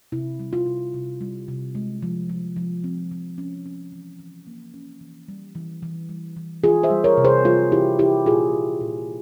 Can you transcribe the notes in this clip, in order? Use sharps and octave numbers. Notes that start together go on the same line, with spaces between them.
C3 E4
G3
F4
C3
C3
G3
C3
G#3
F3
F3
F3
C4
F3
C#4
C#4
E3
E3
A#3
C#4
E3
G3
E3
E3
G3
E3
E3 F4 G#4
C5 E5
G3
A#4 C#5
C3
G#4 C5
G3 F4 G#4
E3 E4 G4
G3 E4 G4
A#2 F4 G#4
A#2
A#2